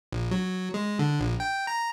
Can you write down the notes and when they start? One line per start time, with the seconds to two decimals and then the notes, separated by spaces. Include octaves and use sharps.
0.12 A#1
0.31 F#3
0.74 G#3
0.99 D3
1.20 A#1
1.40 G5
1.67 A#5